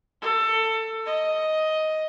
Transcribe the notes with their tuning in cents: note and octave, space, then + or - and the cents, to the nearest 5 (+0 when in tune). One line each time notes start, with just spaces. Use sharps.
A4 +20
D#5 +10